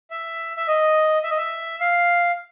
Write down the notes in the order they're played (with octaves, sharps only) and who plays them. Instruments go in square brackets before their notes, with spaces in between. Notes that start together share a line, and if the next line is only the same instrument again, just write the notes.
[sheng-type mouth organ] E5
E5
D#5
E5
D#5
E5
F5